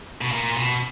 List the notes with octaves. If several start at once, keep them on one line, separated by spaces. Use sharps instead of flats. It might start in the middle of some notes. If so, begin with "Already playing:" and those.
B2
A#2
B2